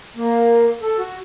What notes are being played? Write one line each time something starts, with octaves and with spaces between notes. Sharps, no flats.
A#3
A4
F#4